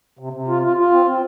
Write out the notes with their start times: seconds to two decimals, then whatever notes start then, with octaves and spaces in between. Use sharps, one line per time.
0.19 C3
0.33 C3
0.48 F4
0.62 F4
0.77 F4
0.92 C4
1.06 C4